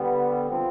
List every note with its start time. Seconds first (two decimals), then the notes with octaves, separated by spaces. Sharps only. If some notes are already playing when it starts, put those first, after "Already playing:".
Already playing: D3 G3 B3
0.49 F3 C4